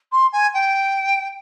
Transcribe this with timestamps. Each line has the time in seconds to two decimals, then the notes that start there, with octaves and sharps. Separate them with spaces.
0.12 C6
0.33 G#5
0.54 G5